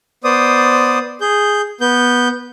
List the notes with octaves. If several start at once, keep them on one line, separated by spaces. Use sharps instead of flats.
B3 C5 D5 D#6
G#4 G6
B3 G6